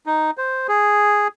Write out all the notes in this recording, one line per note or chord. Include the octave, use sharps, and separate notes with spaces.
D#4
C5
G#4